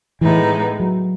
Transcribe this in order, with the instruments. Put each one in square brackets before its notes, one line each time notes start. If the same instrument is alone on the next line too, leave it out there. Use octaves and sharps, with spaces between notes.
[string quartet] A2 G#3 B3 D#4 [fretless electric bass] E3
[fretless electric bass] F#3